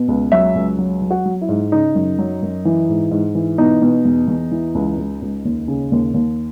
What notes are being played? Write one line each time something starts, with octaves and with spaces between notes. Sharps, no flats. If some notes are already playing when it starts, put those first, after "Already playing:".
Already playing: B2
C#2
F#3 E5
C#2
F#3
F#3
F#4
F#3
E4
G#2
C#3 D#4
F#2
F#3
F#2
E3
G#2
G#2
E3
B2 D#4
B2
E2
E2
E3
C#2
C#2
C#2
D#2
C#3
D#2
D#2